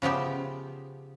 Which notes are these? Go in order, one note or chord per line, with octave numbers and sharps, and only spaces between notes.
C#3 F3 B3 G4 E5